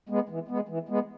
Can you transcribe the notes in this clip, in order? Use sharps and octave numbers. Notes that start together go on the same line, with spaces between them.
G#3 B3
E3
G#3 B3
E3
G#3 B3